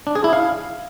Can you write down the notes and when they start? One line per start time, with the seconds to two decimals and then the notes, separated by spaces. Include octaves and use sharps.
0.07 D4
0.15 G#4
0.24 E4
0.33 F5